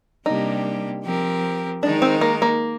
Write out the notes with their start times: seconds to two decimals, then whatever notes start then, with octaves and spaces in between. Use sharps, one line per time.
0.25 C3 G3 A#3 D4 D#4 G4
1.04 F3 C4 G4 A#4
1.83 D#3 G#3 D4 D#4 A#4
2.02 C4
2.21 A#3
2.42 A#3